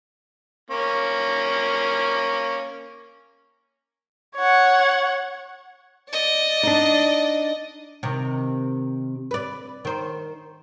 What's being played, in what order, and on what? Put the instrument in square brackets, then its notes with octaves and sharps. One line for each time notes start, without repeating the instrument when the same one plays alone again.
[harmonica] A#3 C#4
[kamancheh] C#5 F#5
[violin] D5 D#5
[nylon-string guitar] D4 D#4
[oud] C3 D#3
B4 D5
D#3 C5